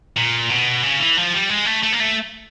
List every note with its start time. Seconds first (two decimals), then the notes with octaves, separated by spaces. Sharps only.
0.17 A#2
0.50 B2
0.83 C#3
1.00 E3
1.17 F3
1.34 G3
1.50 G#3
1.66 A3
1.83 A3
1.93 A#3
2.00 A3